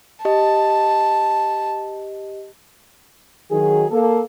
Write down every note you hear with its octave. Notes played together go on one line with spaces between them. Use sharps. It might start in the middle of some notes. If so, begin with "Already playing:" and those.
G4 D#5 A5
D#3 F#3 G#4
A#3 A4